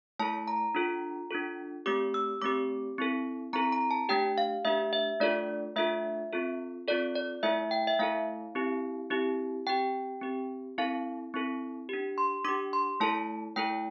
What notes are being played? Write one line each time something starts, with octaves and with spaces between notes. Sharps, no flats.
A3 E4 A4 A5
A#5
D4 F4 A4
D4 F4 A4
A3 C4 G4 D6
E6
A3 C4 G4 D6
C4 E4 A4
C4 E4 A4 A#5
A#5
A5
A3 D4 G4 G5
F5
A3 D4 G4 E5
E5
A3 D4 F4 A4 D5
A3 D4 F4 A4 E5
C4 F4 A4
C4 F4 A4 D5
D5
A3 E4 A4 E5
G5
E5
A3 E4 A4 F5
C4 E4 G4
C4 E4 G4
C4 G4 G5
C4 G4
C4 E4 A4 F5
C4 E4 A4
D4 G4
C6
D4 G4 D6
C6
A3 E4 A4 A5
A3 E4 A4 G5